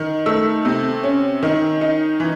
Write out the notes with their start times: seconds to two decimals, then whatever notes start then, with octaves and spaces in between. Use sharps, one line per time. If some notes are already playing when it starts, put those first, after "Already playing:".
Already playing: D#3
0.26 A3 E6
0.65 C3
1.03 C#4
1.43 D#3
1.81 D#4
2.20 E3